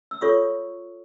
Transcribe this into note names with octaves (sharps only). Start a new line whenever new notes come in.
E6
F4 A4 C#5 C#6 D#6